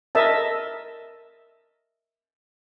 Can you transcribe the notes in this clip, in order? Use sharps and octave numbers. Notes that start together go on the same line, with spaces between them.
A#4 D#5 E5 A5